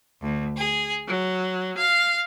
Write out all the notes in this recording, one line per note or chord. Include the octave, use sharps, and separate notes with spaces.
D2
G#4
F#3
F5